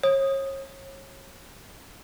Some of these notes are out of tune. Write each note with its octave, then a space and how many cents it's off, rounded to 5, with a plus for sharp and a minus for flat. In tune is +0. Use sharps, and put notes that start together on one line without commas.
C#5 -35 D#6 +0